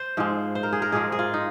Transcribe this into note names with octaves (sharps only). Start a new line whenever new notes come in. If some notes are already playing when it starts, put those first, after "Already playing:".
Already playing: C5
G#2 F3 G#3
C5
A#4
G#4
A#4
G#2 F3 G#3 G#4
G#4
F4
D#4